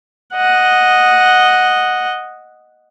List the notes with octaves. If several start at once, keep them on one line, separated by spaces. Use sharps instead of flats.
D#5 F#5